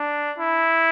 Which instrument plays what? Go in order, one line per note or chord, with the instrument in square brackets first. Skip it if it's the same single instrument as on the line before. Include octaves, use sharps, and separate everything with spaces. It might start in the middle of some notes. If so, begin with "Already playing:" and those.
Already playing: [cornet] D4
E4